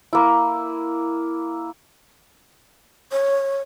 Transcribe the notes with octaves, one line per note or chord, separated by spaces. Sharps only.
A#3 E4
C#5